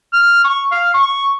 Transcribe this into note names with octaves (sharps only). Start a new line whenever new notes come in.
F6
C#6
F5
C#6